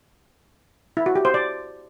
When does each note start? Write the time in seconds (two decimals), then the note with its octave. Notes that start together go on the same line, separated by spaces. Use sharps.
0.97 E4
1.06 F#4
1.15 G4
1.25 C5
1.34 D5